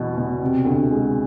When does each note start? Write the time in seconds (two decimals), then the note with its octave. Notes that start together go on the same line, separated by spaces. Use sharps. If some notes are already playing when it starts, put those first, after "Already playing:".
Already playing: E2 B2 B3
0.18 B2
0.42 C3
0.65 D2
0.90 G#3